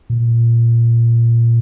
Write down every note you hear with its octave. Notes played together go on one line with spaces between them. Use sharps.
A#2